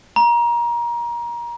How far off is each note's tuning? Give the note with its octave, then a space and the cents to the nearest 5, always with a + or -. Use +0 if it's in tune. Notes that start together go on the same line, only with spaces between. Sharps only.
A#5 +25